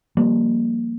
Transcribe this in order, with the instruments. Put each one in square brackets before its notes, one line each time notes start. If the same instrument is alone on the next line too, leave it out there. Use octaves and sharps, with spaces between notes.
[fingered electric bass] F3 G3 A#3